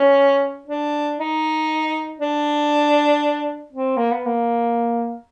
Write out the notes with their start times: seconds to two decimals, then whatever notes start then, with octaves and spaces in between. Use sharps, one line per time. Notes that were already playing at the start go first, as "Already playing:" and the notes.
Already playing: C#4
0.68 D4
1.19 D#4
2.20 D4
3.73 C4
3.97 A#3
4.11 B3
4.25 A#3